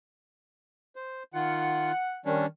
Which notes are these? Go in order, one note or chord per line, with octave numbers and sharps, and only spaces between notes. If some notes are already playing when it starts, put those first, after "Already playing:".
C5
D#3 F4 F#5
D#3 G3 C#4 D4